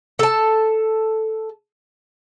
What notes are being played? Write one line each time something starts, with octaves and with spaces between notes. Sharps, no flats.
A4 A5